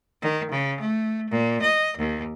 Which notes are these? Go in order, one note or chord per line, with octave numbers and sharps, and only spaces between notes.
D#3
C#3
A3
A#2
D#5
D#2